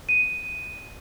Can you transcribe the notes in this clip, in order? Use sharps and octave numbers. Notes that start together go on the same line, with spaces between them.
D#7